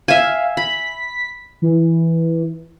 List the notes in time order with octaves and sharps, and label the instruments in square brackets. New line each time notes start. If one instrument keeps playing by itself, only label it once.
[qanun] E5 G#5 [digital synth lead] F5
[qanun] B5 [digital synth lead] B6
[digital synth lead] E3